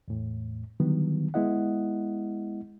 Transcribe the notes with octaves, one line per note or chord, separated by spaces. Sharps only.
E2 A2
D3 D#3 F#3 G3 B3
G#3 B3 E4 D#5 F#5